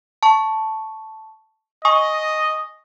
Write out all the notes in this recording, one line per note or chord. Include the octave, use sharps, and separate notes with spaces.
A5 C#6
D#5 G#5 C#6 D#6